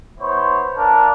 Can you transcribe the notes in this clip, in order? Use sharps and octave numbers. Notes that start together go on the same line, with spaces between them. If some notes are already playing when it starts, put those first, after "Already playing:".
B3 E4 C5 C#5
D4 A#4 F5 A5